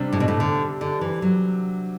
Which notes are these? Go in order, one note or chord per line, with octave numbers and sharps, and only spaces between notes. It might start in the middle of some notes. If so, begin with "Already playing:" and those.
Already playing: C3 G3 D4
A2
B2
A2
D3
D3
E3
F#3